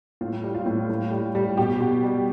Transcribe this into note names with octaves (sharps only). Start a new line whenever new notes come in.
A2 F4
G3
F4
A2
A2
G3
G3
B2 G4
B2
G3